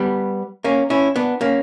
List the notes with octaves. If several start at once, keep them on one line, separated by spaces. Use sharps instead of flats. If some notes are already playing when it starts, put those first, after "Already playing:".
Already playing: G3 B3
A#3 C#4
C#4 E4
B3 D4
A#3 C#4